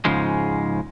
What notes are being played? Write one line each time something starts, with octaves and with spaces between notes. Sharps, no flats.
G#2 C#3 F3 G#3